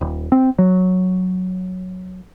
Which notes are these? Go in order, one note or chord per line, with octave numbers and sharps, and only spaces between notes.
D#1
C4
F#3